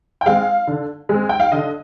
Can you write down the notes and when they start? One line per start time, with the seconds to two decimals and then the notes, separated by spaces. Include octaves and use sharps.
0.21 G5
0.26 G#3 C4 F5
0.67 D3
1.09 G#3 C4
1.29 G5
1.40 F5
1.52 D3 D#5